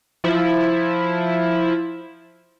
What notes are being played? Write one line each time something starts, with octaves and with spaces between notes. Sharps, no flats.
F3 E4